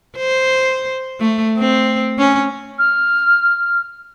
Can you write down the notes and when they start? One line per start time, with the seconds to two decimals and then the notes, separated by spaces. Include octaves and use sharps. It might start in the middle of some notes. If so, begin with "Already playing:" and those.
0.17 C5
1.20 A3
1.59 C4
2.18 C#4
2.79 F6